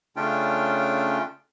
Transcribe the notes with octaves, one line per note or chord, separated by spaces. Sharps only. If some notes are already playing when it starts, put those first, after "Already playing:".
C#3 A3 C#4 D4 F4 G5